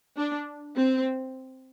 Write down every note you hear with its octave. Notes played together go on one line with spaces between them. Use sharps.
D4
C4